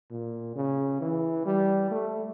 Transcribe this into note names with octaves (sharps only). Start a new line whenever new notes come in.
A#2
C#3
E3
G3
A3